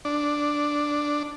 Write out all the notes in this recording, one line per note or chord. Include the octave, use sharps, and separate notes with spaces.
D4